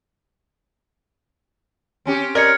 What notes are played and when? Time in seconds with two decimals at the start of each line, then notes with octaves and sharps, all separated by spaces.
2.06 C4 C#4 G4
2.35 A#4 D5 D#5 F6 G#6 C#7